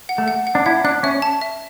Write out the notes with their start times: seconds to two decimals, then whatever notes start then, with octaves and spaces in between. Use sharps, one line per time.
0.09 F#5
0.18 A3
0.28 F#5
0.47 F#5
0.55 D4
0.66 E4 F#5
0.84 D4 F#6
1.03 C#4 E5
1.22 A5
1.41 E5